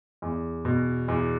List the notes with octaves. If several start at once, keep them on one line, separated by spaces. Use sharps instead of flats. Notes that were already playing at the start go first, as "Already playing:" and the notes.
E2
B2
E2